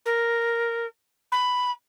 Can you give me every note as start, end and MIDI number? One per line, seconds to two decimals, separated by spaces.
0.05 0.86 70
1.32 1.71 83